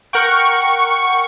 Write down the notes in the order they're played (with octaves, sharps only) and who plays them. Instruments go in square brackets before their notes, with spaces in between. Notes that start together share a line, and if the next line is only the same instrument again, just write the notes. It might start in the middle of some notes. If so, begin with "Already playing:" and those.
[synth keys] A#4 F#5 G5 [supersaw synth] C#6